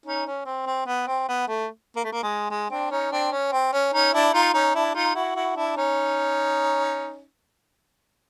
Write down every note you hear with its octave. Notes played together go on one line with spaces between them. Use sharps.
C#4 D#4
C#4
C4
C4
B3
C4
B3
A3
A#3
A3
A#3
G#3
G#3
C4 D4
C#4 D#4
C4 D4
C#4
C4
C#4
C#4 D#4
D4 E4
D#4 F4
C#4 D#4
D4 E4
D#4 F4
E4 F#4
E4 F#4
D4 E4
C#4 D#4